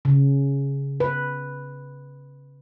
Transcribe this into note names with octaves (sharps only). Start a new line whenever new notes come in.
C#3
B4